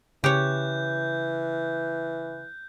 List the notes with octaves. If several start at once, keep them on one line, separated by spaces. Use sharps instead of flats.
C#3 E3 G4 C#5 F#6 G6